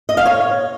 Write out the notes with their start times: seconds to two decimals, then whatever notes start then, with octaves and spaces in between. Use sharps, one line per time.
0.09 D#5
0.17 F5
0.25 C#5